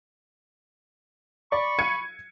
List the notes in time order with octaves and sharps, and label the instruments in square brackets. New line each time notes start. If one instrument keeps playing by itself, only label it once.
[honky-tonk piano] D5 [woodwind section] B5 C#6
[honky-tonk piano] G#6 C#7 D#7